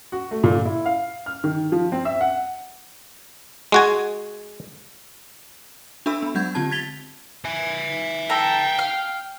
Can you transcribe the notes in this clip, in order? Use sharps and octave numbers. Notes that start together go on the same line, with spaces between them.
F#4
A3
A#2
E4
F5
F6
D#3
F3
C4
E5
F#5
G#3 F#4 G#5
D4 F#4 A4 E5 B5 E6
B3 B5
F#3 G#3 D4 F#5 G6 G#6
D3 C4 F4 G4 A5 G#6
G#6 A6 B6 F7 G7
E5 G#5
A4 G5 A#5
F5